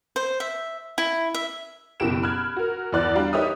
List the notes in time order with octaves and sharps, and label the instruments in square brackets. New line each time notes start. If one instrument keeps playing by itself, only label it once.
[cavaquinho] C5
E5
E4
E5
[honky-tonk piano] F#1 B2 E4 G4 D7 E7
B5 F6 F#6 G#6
F#4 A#4
E2 E4 D5 F#6
G3 D4 F#4 F5
D#4 G4 C#5 E5 D#6